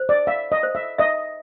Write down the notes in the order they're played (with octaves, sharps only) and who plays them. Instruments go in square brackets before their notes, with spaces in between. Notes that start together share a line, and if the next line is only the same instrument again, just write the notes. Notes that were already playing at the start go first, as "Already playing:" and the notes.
Already playing: [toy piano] C5
[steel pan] D5
[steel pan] E5 [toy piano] F5
[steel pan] D#5
[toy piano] C5
[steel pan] E5
[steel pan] D#5 [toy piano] E5